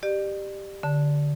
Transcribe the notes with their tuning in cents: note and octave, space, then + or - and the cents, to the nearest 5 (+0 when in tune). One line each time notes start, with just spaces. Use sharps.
G4 +0 D5 +35
D3 -15 A5 +0